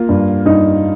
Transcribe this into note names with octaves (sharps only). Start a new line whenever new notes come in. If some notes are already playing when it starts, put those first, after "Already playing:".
Already playing: A#3 F4
G2
G2 D#4